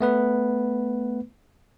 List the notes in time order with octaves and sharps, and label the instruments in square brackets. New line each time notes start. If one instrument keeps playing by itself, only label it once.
[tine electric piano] A3 B3 B4